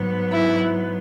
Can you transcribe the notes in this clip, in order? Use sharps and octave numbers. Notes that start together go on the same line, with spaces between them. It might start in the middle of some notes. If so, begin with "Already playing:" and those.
Already playing: G#2 F#3 B3
E4